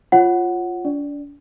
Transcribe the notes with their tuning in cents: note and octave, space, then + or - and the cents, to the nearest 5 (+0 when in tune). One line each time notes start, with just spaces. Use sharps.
F4 +0 C#5 -20 F#5 +0
D4 -35 D5 +0